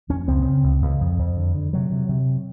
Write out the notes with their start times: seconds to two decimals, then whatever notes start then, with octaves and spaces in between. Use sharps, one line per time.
0.09 F2 C#4
0.28 C#2 C4
0.45 C#3
0.64 C#2
0.82 C#2
1.01 F2
1.19 F2
1.37 D3
1.55 D3
1.73 C3 F#3
1.92 C3
2.09 C3